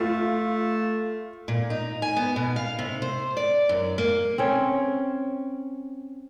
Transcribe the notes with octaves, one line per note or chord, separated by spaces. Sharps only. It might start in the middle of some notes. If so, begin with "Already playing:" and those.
A3 F4
A#2
D#4
G#5
B3
B2
F5
C3
C5
D5
F#2
A#3
C4 C#4 C#5